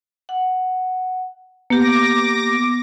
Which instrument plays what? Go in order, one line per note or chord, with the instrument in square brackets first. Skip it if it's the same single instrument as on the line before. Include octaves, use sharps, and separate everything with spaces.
[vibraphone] F#5
[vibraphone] A#3 G4 [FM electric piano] B3 [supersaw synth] D6 A#6